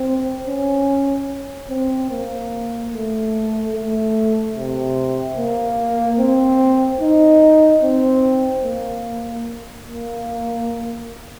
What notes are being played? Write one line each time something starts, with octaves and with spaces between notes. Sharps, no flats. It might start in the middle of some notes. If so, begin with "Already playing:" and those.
Already playing: C4
C#4
C4
A#3
A3
A3
C3
A#3
C4
D#4
C4
A#3
A#3